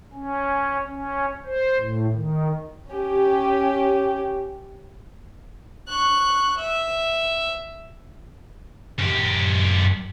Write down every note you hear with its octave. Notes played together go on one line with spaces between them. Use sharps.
C#4
C#4
C5
A2
D#3
C#4 G4
C#6 F#6
E5
F#2 G4